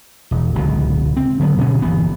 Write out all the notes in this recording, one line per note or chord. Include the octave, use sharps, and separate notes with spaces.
E1
D1 C#2 B2
C4
D3 F#3 B3
B2 D3 E3 C#4
G1 E3 B3